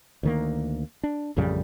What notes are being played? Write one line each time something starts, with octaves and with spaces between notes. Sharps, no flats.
D2 D#3 A#3
D4
A1 F2 C#3 G3